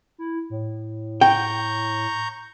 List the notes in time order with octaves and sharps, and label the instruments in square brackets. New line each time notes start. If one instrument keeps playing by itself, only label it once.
[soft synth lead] E4
A2
[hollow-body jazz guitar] G5 [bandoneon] A#5 C#6 G6